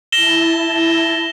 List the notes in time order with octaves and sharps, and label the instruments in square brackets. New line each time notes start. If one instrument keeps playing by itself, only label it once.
[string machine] E4 A5 [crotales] A#6 E7 G7